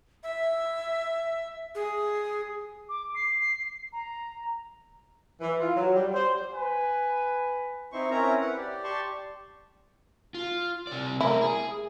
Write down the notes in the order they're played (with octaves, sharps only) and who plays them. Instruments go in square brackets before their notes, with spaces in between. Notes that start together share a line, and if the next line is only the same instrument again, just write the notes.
[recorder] E5
G#4
[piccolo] D6
C7
A#5
[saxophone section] E3
F4
F#3
G3
C5
[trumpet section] B4 G#5
[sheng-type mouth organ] C4 D#4 E4 C5 C#6
C4 C#4 E4 A#4 C#5 A#5
B4 F#5
G4 D5
G4 D5 A5 C6 C#6
[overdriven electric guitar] F4
C3 D5
[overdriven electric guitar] A3 A#4 [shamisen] E4
[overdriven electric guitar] G#4